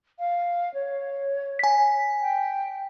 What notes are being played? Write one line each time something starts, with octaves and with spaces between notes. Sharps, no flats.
F5
C#5
G#5 B6
G5